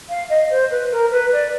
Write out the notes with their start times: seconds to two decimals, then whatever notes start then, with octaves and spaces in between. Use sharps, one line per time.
0.09 F5
0.29 D#5
0.50 C5
0.70 B4
0.91 A#4
1.11 B4
1.31 D5